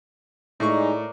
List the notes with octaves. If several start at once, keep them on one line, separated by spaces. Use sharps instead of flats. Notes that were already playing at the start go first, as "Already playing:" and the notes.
A2 G#3 D#4 A#4 D5 C#6